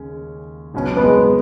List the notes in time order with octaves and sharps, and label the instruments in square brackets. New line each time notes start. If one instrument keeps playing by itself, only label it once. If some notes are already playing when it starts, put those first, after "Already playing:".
Already playing: [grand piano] D#2 C#3 G#3 C#4
C#2 B2 F#3 C#4 B4
[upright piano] B3
G#3